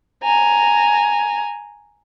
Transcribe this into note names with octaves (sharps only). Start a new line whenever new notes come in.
G#5 A#5